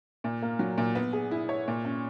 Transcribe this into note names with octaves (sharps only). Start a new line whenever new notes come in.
A#2
A#3
F#3
A#2
B3
G#4
E4
C#5
A#2
C#4